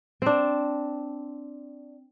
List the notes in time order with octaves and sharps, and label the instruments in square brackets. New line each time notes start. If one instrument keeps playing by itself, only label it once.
[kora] C4 D4